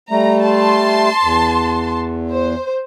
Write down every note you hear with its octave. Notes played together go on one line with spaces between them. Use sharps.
G3 A3 A#5
A5 C6
E2
C5